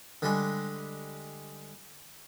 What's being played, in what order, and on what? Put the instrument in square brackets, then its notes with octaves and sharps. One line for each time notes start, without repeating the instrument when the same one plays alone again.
[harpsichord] D3 G3 G#3